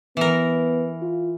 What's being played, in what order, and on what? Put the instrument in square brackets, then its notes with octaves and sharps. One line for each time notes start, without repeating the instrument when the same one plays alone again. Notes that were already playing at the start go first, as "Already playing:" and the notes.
[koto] E3 A#4 [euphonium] B3
[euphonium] F4